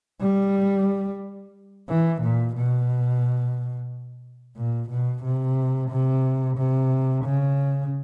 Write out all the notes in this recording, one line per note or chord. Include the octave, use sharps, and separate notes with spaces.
G3
E3
A#2
B2
A#2
B2
C3
C3
C3
C#3